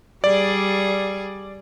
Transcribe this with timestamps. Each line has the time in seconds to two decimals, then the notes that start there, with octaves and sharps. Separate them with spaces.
0.24 G3 G#4 D5